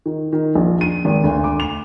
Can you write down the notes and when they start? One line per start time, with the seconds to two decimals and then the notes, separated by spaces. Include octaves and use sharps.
0.06 D#3
0.33 D#3
0.55 A#1
0.81 D#7
1.05 G#1
1.24 D2
1.44 D6
1.60 F7